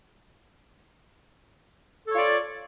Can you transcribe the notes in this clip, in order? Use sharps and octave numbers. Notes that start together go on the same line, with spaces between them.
F4 A4 C#5 D5